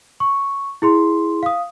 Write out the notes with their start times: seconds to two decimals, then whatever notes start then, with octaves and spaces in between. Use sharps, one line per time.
0.20 C#6
0.82 E4 G#4 C6
1.43 F5 D#6